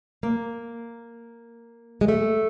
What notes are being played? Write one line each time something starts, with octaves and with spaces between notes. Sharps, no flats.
A#3
G#3
A3